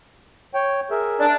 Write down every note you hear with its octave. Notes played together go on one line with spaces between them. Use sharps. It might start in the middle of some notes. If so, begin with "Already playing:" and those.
C#5 G5
G#4 A#4 E5
D4